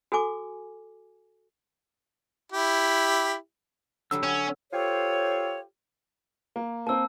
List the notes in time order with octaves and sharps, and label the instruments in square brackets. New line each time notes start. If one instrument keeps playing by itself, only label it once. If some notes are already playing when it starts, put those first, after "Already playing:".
[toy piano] F#4 A4 G#5 D6
[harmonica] E4 G4
[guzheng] D3 F#3 G3 [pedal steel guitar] E6
[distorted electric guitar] C#4 [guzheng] G#5
[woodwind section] F4 G4 A4 C5 C#5
[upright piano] A#3
[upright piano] A#3 C4 [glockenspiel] A5 E6